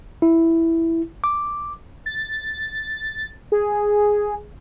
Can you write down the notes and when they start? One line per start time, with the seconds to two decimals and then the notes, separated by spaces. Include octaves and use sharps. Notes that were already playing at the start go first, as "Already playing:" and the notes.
0.22 E4
1.24 D6
2.06 A6
3.52 G#4